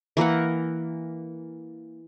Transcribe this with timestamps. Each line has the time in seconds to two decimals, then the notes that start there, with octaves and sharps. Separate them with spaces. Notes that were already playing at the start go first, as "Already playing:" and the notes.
0.17 E3 A#3 A#4 F#5